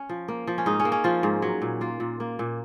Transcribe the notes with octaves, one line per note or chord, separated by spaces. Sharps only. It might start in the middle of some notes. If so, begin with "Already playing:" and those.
Already playing: C#4
F3
A#3
F3
C#4
G#2 D#4
C#4
A#3
C#4
F3 F4
G#2
F#3
A#2
A#3 F4
A#2
A#3
A#2